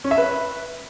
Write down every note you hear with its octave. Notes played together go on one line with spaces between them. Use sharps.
C#4
E5
B4